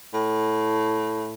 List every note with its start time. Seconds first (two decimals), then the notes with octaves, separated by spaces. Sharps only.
0.14 A2